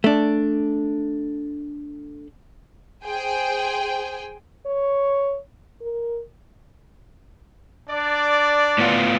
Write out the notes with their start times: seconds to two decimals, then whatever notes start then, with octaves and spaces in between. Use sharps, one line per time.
0.04 A3 D4
3.04 G#4 C5 G5 G#5
4.66 C#5
5.81 A#4
7.89 D4 D5
8.78 A2 B3 F4